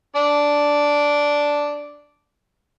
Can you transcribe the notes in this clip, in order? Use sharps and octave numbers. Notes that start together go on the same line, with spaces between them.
D4 D5